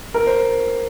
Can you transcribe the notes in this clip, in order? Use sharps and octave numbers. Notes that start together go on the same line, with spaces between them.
A#4
C5